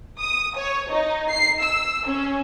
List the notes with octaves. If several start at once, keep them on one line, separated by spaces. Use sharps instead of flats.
D#6
C#5
D#4
C7
E6
C#4